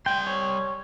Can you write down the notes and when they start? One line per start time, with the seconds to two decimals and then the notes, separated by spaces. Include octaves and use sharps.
0.06 G3 G5 C6
0.27 C#5